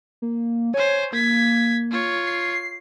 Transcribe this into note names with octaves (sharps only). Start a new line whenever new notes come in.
A#3
C5 C#5 G#5
A#3 G#6 B6
F4 C#5
C7